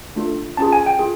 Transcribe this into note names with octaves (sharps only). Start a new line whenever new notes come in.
A3 D4 F4 A4
C#4 F4 G#4 A5
G#5
G5
F4 G#4